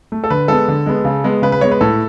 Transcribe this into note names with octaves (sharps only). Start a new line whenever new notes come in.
A3
A4
D3 B4
G#3 B3 A4
D3
G#3 B3
C#3
G#3 B3
C#3 B4
B4
G#3 B3 C#5
B4
A2 A4